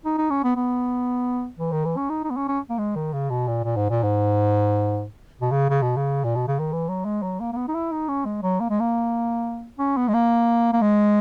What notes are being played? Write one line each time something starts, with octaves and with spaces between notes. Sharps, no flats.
D#4
D#4
C#4
B3
B3
E3
D#3
E3
C#4
D#4
D#4
B3
C#4
C#4
A#3
G#3
D#3
C#3
B2
A#2
A#2
G#2
A#2
G#2
B2
C#3
C#3
B2
C#3
A#2
B2
C#3
D#3
E3
F#3
G#3
F#3
A#3
A#3
B3
D#4
E4
D#4
C#4
G#3
F#3
A#3
G#3
A#3
C#4
B3
G#3
A#3
A#3
G#3